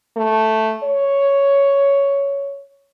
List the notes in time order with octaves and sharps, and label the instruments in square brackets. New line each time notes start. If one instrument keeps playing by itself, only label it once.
[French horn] A3
C#5